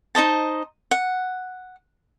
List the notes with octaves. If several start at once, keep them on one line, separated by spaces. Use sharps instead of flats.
D#4 C5 D#5 A5
F#5